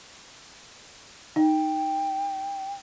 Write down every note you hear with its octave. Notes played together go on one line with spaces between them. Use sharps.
D#4 G5